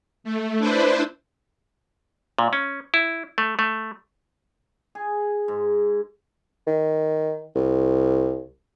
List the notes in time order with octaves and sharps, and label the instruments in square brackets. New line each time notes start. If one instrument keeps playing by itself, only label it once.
[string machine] A3
D4 E4 B4 C5
[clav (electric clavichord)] A#2
C#4
E4
A3
A3
[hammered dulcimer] G#4
G#2
[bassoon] D#3
C2